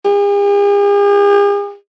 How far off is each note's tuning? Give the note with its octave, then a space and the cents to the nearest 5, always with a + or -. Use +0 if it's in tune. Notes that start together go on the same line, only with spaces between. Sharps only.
G#4 -45